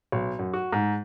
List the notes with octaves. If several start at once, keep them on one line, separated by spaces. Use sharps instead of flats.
B1
F#2
F#4
G#2